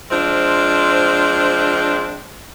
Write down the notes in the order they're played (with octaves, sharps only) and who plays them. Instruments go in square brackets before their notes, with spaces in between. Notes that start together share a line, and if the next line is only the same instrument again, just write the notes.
[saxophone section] F3 G#3 C4 D4 C5